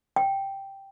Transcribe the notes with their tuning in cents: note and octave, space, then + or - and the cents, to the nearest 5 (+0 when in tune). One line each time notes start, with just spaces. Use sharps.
G5 -5